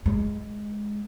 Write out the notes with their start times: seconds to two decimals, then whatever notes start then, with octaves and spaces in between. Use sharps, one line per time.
0.06 G#3